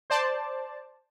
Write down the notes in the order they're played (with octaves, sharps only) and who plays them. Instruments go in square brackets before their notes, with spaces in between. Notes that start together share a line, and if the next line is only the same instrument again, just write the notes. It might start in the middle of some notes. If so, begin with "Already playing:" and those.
[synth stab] C5 D5 A5